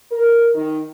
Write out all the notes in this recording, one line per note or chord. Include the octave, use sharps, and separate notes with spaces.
A#4
D#3